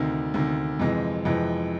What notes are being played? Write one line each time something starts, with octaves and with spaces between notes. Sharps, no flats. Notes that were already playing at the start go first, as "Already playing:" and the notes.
Already playing: D2 C3 D#3
D2 C3 D#3
F2 C3 E3 G#3
F2 C3 E3 G#3